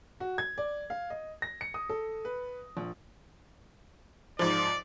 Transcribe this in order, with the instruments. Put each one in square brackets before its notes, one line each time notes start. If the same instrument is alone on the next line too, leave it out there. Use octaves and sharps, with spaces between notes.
[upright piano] F#4
G#6
D5
F5
D#5
A#6
C#7
D#6
A4
B4
A#1
[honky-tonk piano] G#2 F3 [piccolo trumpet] D5